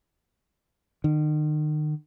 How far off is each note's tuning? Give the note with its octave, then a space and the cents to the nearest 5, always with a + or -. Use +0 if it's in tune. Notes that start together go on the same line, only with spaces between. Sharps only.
D#3 -40